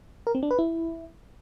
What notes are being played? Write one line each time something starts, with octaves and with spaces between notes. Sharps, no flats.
A#4
C4
D4
B4
E4